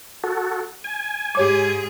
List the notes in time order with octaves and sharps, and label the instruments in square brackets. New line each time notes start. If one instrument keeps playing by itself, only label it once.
[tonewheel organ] F#4 A4
G#5
[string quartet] G#2 G#4 [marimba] G4 C#5 D6